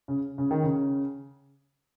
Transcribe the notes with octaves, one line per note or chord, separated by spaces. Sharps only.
C#3
C#3
D#3
C#3